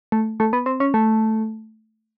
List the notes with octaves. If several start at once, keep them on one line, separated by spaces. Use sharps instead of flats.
A3
A3
B3
C4
C#4
A3